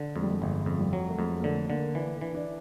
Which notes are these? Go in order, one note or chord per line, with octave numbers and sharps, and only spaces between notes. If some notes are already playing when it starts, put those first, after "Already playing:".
Already playing: D3
F2 G#3
G3
G#3
G1 G#3
F2
G3
F#3
A3
F2 G#3
A#3
D3 A3
D3 A#3
E3 D4
E3
D4